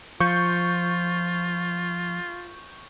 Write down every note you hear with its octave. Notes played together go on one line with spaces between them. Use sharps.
F3 F4 C#6 G6